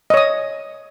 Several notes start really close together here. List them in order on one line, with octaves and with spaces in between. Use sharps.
D#5 C#5 D#6